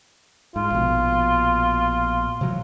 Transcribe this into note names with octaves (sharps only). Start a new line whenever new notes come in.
G#2 F4
A#1 B2
C3 E3 F#3